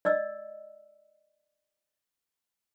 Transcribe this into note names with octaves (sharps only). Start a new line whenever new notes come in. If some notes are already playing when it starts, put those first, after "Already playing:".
D5 D#5 E6